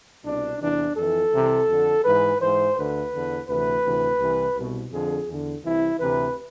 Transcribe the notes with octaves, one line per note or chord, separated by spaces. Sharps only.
C2 B2 D4
E2 C3 E3 D4
F2 E3 A4
C2 C3 E3
F2 D3
G#2 E3 B4
G#2 E3 C5
D2 D3 B4
E2 D3
D2 C3 E3 B4
D2 C3 E3
C2 C3 E3
C2 B2
F2 D3 G#4
E2 D3
C2 C3 E3 E4
D2 C3 E3 B4